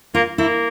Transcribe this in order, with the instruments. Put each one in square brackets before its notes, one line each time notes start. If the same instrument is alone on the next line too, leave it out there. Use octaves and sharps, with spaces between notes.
[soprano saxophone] A#3 [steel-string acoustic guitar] F4
[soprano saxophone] A#3 [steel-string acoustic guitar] E4